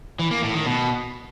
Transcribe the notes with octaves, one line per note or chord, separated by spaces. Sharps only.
E3
A#3
A2
D#3
B2